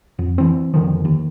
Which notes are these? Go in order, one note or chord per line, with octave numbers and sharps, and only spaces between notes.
F2
E3 C4
F1 D3 D#3 F3
D#2